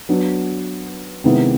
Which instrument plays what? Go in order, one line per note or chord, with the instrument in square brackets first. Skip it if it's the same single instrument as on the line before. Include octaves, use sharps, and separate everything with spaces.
[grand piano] F#3 B3 D4
C3 D#3 G#3 B3 E4